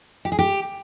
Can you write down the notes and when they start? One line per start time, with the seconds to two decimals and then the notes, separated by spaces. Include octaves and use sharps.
0.25 G4
0.32 G#4
0.39 G4